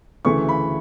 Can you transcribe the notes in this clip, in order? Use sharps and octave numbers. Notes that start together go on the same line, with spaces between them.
D2 C#3 E3 A3 C#6
B5